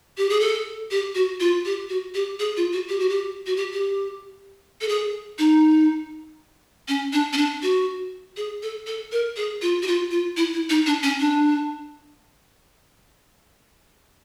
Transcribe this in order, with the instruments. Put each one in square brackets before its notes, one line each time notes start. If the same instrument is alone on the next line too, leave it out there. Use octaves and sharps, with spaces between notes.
[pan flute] G4
G#4
A4
G4
F#4
F4
G4
F#4
G4
G#4
F4
F#4
G4
F#4
G4
F#4
G4
G4
A4
G#4
D#4
C#4
D4
C#4
D4
F#4
G#4
A4
A4
A#4
G#4
F4
F#4
F4
F4
E4
E4
D#4
D4
C#4
D4